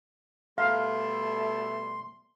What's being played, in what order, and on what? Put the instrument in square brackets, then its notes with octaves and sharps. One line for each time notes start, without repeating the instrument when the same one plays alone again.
[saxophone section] B2 G3 A3 [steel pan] F5 [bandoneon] C6